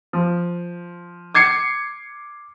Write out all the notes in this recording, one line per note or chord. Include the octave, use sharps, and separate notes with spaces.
F3
D6 G#6 C7 C#7